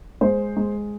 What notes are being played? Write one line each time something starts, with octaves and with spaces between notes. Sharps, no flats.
G#3 C5
G#3